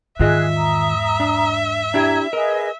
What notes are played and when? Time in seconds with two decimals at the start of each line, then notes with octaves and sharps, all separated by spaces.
0.19 E2 G#2 D#3 F4 G#4 D#5 E5 F#6
0.57 A#5 D#6
1.20 D4
1.94 D4 E4 G4 A#5 G#6
2.33 G#4 A#4 B4 D#5